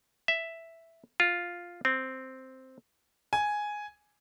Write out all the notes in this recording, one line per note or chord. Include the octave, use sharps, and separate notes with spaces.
E5
F4
C4
G#5